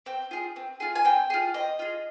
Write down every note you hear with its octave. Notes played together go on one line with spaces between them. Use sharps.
C4 G5
F4 G#4
C4
F4 G#4
G#5
C4 G5
F4 G#4
C4 D#5
F4 G#4